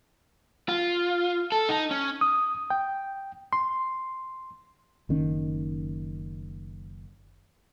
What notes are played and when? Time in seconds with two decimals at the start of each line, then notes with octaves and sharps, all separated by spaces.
0.69 F4
1.52 A4
1.69 D#4
1.91 C#4
2.21 D#6
2.70 G5
3.53 C6
5.09 F#1 D#3 C#4